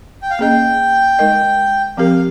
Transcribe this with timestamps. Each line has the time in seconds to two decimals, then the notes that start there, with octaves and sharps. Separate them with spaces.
0.22 G5
0.31 F5
0.39 A#3 C#4 G#4 D#5 G5
1.19 G#3 D#4 A#4 D#5
1.97 F3 C4 G4 A#4 F5